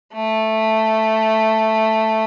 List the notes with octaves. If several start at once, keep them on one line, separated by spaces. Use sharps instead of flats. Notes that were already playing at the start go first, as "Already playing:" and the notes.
A3